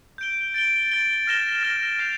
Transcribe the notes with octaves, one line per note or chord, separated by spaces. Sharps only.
G6 D7 G7
A6 D7 G7
A6 D7 G7
F6 A#6 E7 G7
F6 A#6 E7 G7
G6 C7 F7